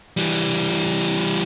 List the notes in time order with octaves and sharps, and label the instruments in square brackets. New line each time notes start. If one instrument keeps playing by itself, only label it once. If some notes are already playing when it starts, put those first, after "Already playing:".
[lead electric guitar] E3 G3